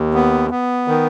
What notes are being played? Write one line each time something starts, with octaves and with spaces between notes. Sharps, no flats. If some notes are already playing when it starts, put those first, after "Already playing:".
Already playing: D#2
B3
B3
D#3